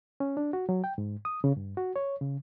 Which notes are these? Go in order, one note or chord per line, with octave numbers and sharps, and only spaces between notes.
C#4
D4
F#4
F#3
G5
G#2
D#6
C#3
G2
F#4
C#5
C#3